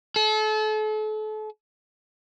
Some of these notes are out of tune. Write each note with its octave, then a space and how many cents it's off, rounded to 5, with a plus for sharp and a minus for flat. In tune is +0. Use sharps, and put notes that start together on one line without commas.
A4 -35